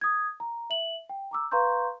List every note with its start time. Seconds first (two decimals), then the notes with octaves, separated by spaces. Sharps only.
0.01 D#6 G#6
0.40 A#5
0.70 E5 F#7
1.09 G5
1.31 A#5 D6 E6
1.51 B4 F5 A#5 C6 C#6 G6